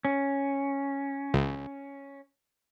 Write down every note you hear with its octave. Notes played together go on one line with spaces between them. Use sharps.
C#4
C#2